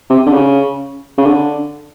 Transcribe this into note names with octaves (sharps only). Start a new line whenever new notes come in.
C3
D3
C#3
C#3
D3